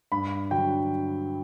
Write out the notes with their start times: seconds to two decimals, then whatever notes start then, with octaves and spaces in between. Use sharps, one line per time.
0.12 G2 B5
0.51 D3 F#3 G5